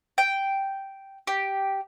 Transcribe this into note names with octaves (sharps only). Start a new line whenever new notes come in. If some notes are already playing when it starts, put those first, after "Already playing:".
G5
G4